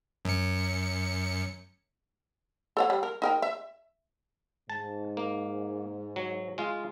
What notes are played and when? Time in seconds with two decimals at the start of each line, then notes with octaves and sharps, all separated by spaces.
0.25 F#2 C#7
2.77 A4 C#5 F#5
2.90 G3
3.03 A#4
3.22 D#4 A#4 G5
3.42 E5
4.70 G#2 A5
5.17 A#3
6.16 F#3
6.58 G#3 F4